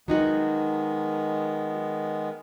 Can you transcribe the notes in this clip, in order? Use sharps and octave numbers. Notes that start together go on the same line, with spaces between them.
D#3 F#3 G#3 B3 D#4 F#4